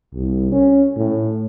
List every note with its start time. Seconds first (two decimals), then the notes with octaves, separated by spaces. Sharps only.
0.13 C2
0.52 C#4
0.97 A2